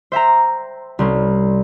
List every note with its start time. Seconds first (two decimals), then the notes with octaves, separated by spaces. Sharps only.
0.12 C5 E5 G5 A#5
0.99 C2 C4 C#4